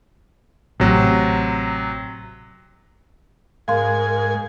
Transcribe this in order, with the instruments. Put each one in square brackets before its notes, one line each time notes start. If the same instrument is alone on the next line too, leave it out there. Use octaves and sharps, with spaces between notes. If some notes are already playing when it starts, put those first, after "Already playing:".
[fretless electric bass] A1 [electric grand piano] C3 F#3
[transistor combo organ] G#2 G#5 [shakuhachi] A#4 [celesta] F5 C6